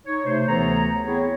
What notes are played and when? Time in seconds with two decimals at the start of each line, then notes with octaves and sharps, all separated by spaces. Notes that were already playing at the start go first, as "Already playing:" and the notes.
0.05 D#4 C#5
0.26 C3 A3 C5
0.47 D2 E3 B3 A4 C#5 A#5
1.06 B3 C4 E4 G#4 C#5